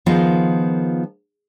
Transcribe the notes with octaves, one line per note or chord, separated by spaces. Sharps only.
D#3 F3 B3 F4 G#4 A#4